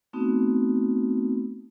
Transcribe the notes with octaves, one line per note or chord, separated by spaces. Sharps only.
A3 B3 C4 D#4 F#4